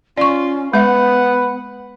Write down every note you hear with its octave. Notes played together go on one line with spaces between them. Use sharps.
C#4 F4 D5 C#6
G#3 B3 B4 E5 F#5